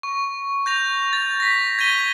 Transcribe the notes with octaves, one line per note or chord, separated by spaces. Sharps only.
C#6
G6 A#6 F7
A6
A#6 B6
G#6 B6 D#7 G7